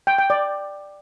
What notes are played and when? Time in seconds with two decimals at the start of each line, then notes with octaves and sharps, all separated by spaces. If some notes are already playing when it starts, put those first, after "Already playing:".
0.07 G5
0.18 G5
0.30 D5